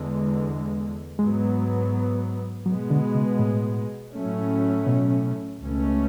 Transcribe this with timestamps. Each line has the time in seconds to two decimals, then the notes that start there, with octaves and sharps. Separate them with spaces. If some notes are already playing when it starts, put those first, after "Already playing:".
Already playing: E2 D3 G#3
1.18 G#2 F#3 G#3 B3
2.65 B2 F#3 G#3 B3
2.90 D3
3.15 C#3
3.39 A2
4.13 A2 F#3 A3 C#4
4.86 B2
5.61 C#2 B2 A3 C#4